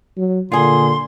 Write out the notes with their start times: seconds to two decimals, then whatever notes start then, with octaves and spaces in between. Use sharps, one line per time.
0.17 F#3
0.52 A#2 D3 F4 G#4 C6